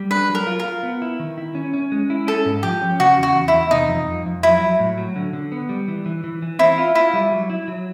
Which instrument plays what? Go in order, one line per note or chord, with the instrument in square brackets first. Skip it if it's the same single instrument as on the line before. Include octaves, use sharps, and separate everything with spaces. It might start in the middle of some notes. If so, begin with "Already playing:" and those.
Already playing: [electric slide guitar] G3
[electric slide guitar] D4 [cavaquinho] B4
[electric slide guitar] F#3
[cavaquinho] A#4
[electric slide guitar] F4
[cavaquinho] A#4
[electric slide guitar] F4
B3
E4
D#3
E4
C#4
C#4
G#3
E4
[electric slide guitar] C#4 [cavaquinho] A4
[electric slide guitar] G#2
[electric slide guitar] F3 [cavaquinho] G4
[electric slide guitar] C#4
[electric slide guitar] C#3 [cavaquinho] F#4
[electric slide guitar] E2 [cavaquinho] F#4
[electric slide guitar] E2
[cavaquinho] E4
[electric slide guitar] E2
[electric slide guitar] C3 [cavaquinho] D#4
[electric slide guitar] F2
F2
F2
[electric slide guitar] F#3 [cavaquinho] E4
[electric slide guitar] F#3
A2
F#3
D3
D3
B3
G3
E3
E3
E3
E3
[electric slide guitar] C4 [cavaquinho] E4
[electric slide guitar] F4
[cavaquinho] E4 [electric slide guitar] F4
[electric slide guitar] G3
F#3
E4
F#3